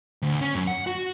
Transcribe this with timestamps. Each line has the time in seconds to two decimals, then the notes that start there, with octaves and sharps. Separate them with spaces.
0.22 D2
0.41 C#4
0.55 F#2
0.67 F#5
0.87 F#4